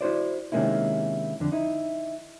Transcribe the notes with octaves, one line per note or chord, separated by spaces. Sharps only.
E4 F#4 C5 D5
C3 D#3 G#3 A#3 C#4 E4
F2 D3
D#4 E4